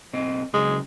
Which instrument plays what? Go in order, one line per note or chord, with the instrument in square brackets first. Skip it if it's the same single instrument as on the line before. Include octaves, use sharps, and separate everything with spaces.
[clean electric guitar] B1 C4 D#5
[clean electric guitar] C#3 F#3 [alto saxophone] G#3